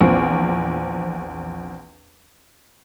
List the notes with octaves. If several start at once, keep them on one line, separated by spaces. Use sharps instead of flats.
A#1 E2 C4 F4